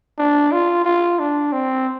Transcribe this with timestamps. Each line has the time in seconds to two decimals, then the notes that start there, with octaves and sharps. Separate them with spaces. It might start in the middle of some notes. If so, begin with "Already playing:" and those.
0.18 D4
0.52 F4
0.85 F4
1.19 D4
1.52 C4